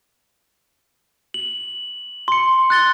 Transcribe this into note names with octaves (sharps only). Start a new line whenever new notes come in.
F#7
C6 C#7
F#6 A6 G7